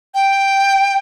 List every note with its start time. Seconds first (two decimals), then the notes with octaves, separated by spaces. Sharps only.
0.14 G5